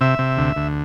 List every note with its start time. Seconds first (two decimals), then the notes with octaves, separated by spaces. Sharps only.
0.01 C3 E5
0.19 C3
0.37 D2
0.56 D2